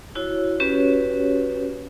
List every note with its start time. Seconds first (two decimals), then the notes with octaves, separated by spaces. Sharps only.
0.15 E4 F#4 C#5
0.60 C#4 F#4 G4 B4 C#5